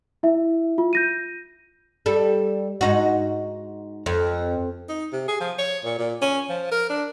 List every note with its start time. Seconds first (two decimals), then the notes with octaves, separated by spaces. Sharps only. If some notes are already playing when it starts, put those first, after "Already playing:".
0.23 E4 E5
0.78 F4
0.93 G6 A#6 D#7
2.06 G3 A4
2.81 G#2 D#4 F#4
4.06 F2
4.89 D#4
5.12 C3
5.28 G#4
5.40 F3
5.58 C#5
5.84 A#2
5.98 A#2
6.22 C#4
6.49 F3
6.71 A#4
6.89 D4